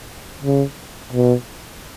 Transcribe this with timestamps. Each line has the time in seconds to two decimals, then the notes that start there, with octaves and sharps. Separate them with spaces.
0.42 C#3
1.12 B2